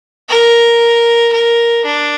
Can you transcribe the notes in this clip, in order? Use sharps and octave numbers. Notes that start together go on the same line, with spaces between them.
A#4
A#4
D4